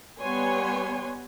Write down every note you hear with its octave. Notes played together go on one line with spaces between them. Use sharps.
G3 B3 B4 C#5 G#5 C6